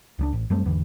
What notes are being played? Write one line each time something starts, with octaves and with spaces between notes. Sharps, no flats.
C#2 F3 D4
A1
F#2 G3 A3 C4
G#1 E2 D3 E3